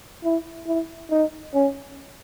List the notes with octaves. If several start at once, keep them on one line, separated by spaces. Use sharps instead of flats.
E4
E4
D#4
C#4